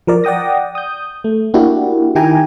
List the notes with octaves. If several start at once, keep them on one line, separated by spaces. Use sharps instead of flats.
F3 A#4 D5
D5 F#5 G5 D#6 A#6
D#6 G6
A3
A#3 D4 E4 F#4 G4
D#3 E4 G4 G5 G#5 A#5